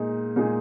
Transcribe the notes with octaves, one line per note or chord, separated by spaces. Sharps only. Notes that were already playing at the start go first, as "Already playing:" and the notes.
Already playing: A#2 G#3 D#4 G#4
A#2 G#3 D#4 G#4